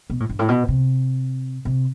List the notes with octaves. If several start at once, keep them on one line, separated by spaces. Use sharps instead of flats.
B2
A2
G2
A2
B2
C3
C3